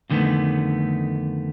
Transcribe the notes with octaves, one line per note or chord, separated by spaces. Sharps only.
F2 D3 D#3 G#3 A3 B3